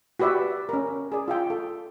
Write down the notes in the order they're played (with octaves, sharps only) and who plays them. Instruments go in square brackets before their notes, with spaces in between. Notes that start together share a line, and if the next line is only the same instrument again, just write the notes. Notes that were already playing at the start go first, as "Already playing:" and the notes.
[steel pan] F#4 G4 B4 D5 E5
C#4 A#4
G#4 D5
F4 E5 G5
A4